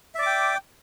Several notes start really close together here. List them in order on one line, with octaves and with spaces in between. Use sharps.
E5 D5 D6 G5